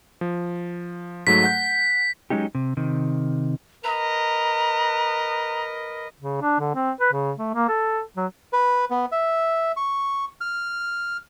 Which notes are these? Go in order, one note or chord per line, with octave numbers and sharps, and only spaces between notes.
F3
G#2 F#3 A3 B6
F#5 G6
F#3 G#3 C#4 D#4 G4
C3
C3 D#3
A#4 B4 D#5 A#5
C#3
D4
D3
C4
B4
C#3
A3
A#3
A4
F#3
B4
B3
E5
C#6
F6